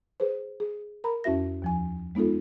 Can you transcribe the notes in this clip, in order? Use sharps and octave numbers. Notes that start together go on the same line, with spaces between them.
G#4 B4 C5
G#4
A#4 A#5 B5
F2 C#4 E4 F#4 E5 A#6
D#2 F3 G#5
G#3 B3 D#4 F4 A4